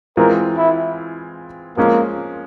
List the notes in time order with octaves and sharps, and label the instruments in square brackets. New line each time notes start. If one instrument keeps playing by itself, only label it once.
[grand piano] E3 G#3 C4 F4 [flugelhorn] A#4
[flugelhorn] E4
[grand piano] F3 G#3 C#4 [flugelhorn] A#3